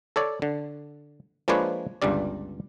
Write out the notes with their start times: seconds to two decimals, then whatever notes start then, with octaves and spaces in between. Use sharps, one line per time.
0.16 A4 C#5 D5
0.42 D3
1.48 F3 G#3 A#3 D4 B4 C#5
2.02 G1 C#2 G2 G3 D5